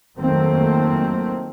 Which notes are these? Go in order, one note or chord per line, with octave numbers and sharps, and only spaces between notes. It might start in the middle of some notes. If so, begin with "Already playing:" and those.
F2 D#3 F#3 A3 A#3 C4